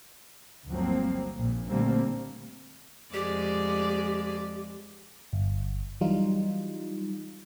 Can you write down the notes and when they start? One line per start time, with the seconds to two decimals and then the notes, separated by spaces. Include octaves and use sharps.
0.68 G1 D2 F3 F#3 A#3 C4
1.37 A#1 A#2
1.68 A#2 D3 G3 A3 A#3 C4
3.14 F2 G#3 G4 D5
5.33 G1
6.01 E3 F#3 G3 D#4 F4